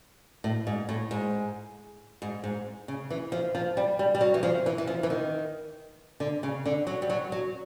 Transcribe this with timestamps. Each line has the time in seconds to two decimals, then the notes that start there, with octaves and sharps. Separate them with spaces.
0.44 A2
0.67 G#2
0.89 A2
1.11 G#2
2.22 G#2
2.44 G#2
2.88 C#3
3.10 E3
3.32 F3
3.55 F3
3.77 G3
3.99 G3
4.14 G3
4.21 F#3
4.34 E3
4.43 F3
4.66 E3
4.78 E3
4.87 F3
5.03 E3
5.10 D#3
6.20 D3
6.43 C#3
6.65 D3
6.87 F#3
7.02 G3
7.10 F#3
7.32 F#3